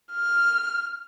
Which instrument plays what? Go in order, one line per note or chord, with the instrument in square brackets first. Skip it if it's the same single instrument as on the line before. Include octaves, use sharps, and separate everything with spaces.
[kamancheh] F6